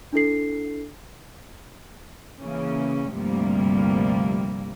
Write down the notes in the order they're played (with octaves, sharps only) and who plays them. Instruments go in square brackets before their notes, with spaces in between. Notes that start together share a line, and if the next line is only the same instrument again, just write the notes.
[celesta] D4 E4 A4 C7
[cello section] C#3 E3 A#3 C#4
D2 G2 C3 F3 G3 A#3